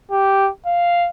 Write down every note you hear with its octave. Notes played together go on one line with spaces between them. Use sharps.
G4
F5